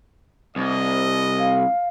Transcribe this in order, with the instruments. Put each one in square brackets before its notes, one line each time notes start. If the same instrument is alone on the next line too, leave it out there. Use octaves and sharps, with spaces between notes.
[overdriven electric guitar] C2 [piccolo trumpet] D#5
[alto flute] F5